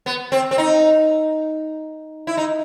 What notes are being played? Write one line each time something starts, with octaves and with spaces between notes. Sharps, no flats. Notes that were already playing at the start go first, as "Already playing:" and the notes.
B3
C4
C4
D#4
E4
D#4